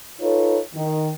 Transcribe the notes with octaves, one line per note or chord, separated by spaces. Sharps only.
D#4 F4 A4 B4 C#5
D#3